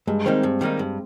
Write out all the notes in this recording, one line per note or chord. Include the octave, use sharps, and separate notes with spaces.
G2 G#3
D#3 G3 A#3 C4 D#4
G2
D#3 G3 A#3 D#4
G2